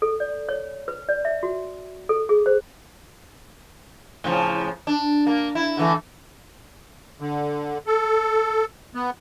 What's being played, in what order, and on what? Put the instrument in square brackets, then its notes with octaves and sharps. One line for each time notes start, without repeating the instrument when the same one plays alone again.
[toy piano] A4
D5
C#5
B4
D5
E5
F#4
A4
G#4
C5
[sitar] A2 C#3 F3
D4
A#3
E4
D3 E3 A3
[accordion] D3
A4
B3